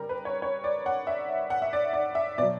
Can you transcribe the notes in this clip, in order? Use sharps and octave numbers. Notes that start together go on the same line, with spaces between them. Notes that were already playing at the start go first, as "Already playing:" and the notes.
Already playing: C#3 G3 A#4
B4
C#5
C#5
D5
F#5
E5
F#5
E5
D5
D5
E5
B2 F#3 D5